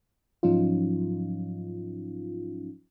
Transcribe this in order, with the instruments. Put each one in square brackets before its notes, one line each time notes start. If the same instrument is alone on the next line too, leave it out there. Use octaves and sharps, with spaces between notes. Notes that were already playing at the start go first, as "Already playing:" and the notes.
[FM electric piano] G#2 F3 F#3 C#4 D#4 F4